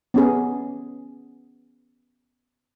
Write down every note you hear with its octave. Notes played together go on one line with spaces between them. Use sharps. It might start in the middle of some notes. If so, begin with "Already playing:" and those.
B3 C#4 G#4